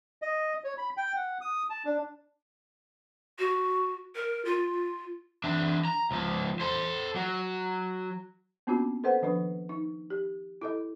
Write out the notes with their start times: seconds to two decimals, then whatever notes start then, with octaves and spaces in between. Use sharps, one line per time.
0.22 D#5
0.64 C#5
0.78 B5
0.97 G5
1.16 F#5
1.41 D#6
1.70 A5
1.85 D4
3.39 F#4
4.15 A#4
4.45 F4
5.44 E3 D4
5.85 A#5
6.11 C#2 F3
6.60 A4 C5
7.15 F#3
8.67 A#3 B3 C#4 D4 F4 F#4
9.04 A4 B4 C5 F#5
9.22 D#3 F3 D4 B4
9.69 D#4
10.10 G4
10.62 E4 A4 D#5